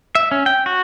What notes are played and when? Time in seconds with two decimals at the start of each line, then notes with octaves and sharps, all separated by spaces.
0.15 E5
0.32 C#4
0.46 G5
0.66 F#4